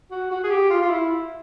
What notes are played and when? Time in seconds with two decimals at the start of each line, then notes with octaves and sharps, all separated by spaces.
0.11 F#4
0.31 F#4
0.43 G#4
0.51 G4
0.70 F4
0.82 F4
0.90 E4